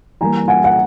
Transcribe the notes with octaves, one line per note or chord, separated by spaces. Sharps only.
E3 G3 A#3 G#5 A#5
F#5 G#5
F#5